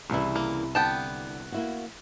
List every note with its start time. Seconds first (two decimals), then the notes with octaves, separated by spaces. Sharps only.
0.10 C2 C#3 E3 G3 E4
0.36 A#3
0.75 D3 B3 G5 A5
1.52 A#3 E4 F#4